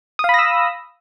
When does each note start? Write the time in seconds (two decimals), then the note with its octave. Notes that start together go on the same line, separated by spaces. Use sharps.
0.19 D#6
0.24 F5
0.29 B5
0.34 A#6
0.39 E6